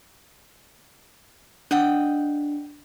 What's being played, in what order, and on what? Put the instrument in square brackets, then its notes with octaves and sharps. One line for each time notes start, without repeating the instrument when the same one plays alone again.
[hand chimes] D4 [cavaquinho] D#5 F#5 G5